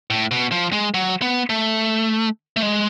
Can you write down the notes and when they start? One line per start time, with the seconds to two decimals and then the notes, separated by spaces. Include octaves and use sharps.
0.10 A2
0.31 B2
0.52 F3
0.73 G#3
0.94 F#3
1.22 B3
1.50 A3
2.56 A3
2.62 G#3